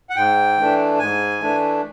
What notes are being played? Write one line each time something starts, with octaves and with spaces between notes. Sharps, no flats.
F#5
G#2 G5
E3 A3 D4
G#2 G#5
E3 A3 D4